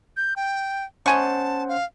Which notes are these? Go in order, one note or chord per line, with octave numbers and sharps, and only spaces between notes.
G6
G5
C#4 C5 D#5 F#5 G#5 A5 C#6
F5